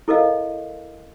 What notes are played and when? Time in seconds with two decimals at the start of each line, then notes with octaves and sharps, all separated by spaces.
0.08 E4 A4 A#4 D#5 F5